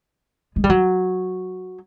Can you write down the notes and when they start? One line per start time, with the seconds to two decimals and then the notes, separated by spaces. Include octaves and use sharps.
0.56 G#3
0.64 G3
0.70 F#3